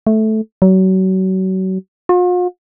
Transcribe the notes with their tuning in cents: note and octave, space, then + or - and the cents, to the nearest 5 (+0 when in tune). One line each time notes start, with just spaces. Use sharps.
A3 -10
F#3 +30
F4 +45